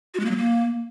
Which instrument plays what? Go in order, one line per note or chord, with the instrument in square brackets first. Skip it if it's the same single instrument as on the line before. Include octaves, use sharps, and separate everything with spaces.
[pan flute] F#4
G#3
A#3
F#3
A#3